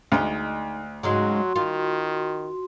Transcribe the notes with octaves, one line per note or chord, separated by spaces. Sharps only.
D2 G#3 D#4
G#2 C#3 F#3 G#3 F#4 C6
D#3 F4